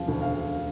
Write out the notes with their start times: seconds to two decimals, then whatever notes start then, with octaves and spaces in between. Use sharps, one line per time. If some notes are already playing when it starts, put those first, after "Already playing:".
Already playing: E1 C#3 F3 F5
0.08 D2
0.22 F5